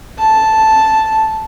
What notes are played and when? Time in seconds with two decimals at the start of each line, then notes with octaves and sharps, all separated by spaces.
0.19 A5